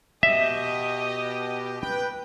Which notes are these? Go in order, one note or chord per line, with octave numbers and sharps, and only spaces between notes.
B2 G4 D#5 E5
B4 G5